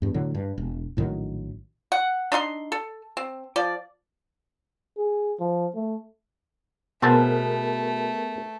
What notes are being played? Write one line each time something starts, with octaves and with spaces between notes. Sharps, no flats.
E2 G2
A2 D3 F#3
G2
E1
A#1 A2 D#3 F#3
F#5
D4 D#4 E5 C6
A4
C4
F3 D5
G#4
F3
A3
B2 A3 B3 C4 G#4 A#4 A5